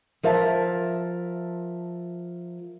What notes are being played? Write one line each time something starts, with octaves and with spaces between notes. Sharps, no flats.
F3 A#4 E5 A5